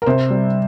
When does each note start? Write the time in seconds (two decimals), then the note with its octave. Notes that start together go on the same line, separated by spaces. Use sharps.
0.02 A#4
0.06 C3 C5
0.30 G3